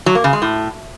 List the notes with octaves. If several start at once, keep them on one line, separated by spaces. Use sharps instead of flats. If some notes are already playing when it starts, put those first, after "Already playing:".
F#3
A#3
C#3
G#3
A2